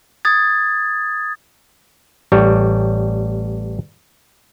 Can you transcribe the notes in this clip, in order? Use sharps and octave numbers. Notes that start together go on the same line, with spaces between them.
D#6 G#6 A6
A1 G3 C#5